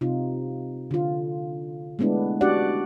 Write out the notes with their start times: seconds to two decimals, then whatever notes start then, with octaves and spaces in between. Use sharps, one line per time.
0.01 C3 D#4 F4
0.91 D3 F4
1.99 G#3 A3 B3 D4 E4
2.41 C#4 D4 F#4 G4 D5 F#5